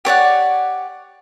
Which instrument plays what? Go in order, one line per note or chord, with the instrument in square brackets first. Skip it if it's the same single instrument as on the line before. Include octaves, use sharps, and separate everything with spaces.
[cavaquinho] G4 C#5 D5 F#5